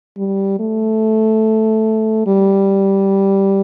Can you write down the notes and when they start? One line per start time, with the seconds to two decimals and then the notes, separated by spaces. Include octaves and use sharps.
0.17 G3
0.60 A3
2.27 G3